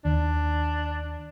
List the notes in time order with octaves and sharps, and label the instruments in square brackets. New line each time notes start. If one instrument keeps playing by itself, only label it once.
[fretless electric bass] D#2 [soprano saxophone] D4